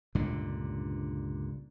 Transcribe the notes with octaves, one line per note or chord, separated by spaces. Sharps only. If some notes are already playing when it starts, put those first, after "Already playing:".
C#2 G2 A#2 D3